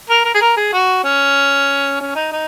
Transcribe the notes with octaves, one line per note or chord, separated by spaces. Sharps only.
A#4
A#4
G#4
A#4
G#4
F#4
C#4
C#4
D#4
D#4